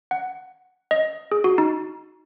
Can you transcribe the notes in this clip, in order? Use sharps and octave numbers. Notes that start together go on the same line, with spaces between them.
F#5
D#5
G#4
F#4
D#4